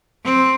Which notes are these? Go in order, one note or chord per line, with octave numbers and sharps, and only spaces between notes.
C4